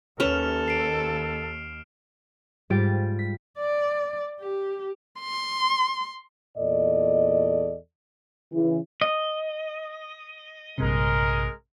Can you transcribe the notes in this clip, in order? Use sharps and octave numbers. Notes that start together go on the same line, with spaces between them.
D#2 C#4 A4 B4 C#5 F6 E7 F7
C7 D7 F7
G#2 G3 F4 G4 A6 D7
B6
D5
G4
C6
E2 A#2 A4 D5 D#5
C#3 E3
D#5
A#1 G2 C3 G#3 A#4